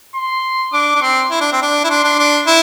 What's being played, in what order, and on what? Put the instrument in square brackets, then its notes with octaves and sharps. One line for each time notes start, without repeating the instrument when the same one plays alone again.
[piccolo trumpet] C6
[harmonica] D4 [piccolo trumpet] D6
[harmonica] D4
[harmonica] C4 [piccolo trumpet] C6
[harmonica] E4
D4
C4
D4
E4
[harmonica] D4 [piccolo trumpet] C6
[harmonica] D4
D4
E4